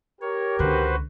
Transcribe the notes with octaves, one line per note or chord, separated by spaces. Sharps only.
G4 A#4 C#5
C#2 D3 F#4 B4 C5